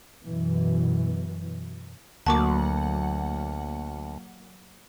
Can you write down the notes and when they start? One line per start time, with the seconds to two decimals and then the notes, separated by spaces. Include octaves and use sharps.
0.23 F#2 B2 E3
2.26 D2 F#3 A#3 F#5 A5 C#6 D6